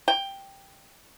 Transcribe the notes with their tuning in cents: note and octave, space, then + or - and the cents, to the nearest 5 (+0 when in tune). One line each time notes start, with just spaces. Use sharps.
G5 +5